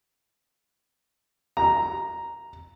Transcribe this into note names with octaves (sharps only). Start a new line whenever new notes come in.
A#5